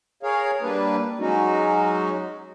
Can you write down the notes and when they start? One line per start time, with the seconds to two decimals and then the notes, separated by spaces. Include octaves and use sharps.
0.23 G#4 A#4 C#5 F5
0.62 G3 A#3 D4 B4
1.19 F#3 G#3 C#4 D#4 F#4